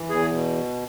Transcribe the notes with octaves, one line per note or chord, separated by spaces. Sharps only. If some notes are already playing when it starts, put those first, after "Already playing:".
Already playing: E3
E2 G#4
B2